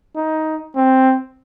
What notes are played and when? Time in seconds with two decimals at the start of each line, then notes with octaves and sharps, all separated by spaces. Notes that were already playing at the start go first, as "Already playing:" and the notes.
0.16 D#4
0.76 C4